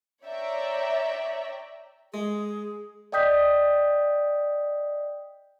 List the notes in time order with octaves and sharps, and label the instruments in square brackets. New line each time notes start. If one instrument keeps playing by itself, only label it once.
[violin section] C#5 D5 E5 G5 A#5
[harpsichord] G#3 [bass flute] G#4
[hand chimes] D5 D#5 G5 D#6 G6 B6